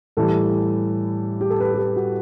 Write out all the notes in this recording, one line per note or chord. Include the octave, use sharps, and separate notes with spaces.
A2 E3 G3 A4
G4
A4
B4
G4
A4
F#4